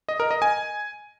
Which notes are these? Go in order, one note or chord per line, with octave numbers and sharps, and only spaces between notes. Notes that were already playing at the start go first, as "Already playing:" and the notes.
D#5
A#4
D#5
G#5